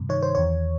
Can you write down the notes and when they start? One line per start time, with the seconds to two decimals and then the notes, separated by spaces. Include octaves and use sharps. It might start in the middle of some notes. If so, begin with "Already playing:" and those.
Already playing: G2 C3
0.09 D#3 C#5
0.22 C5
0.35 E2 C#5